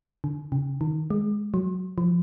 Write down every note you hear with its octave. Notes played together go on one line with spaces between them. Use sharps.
D3
C#3
D#3
G#3
F#3
F3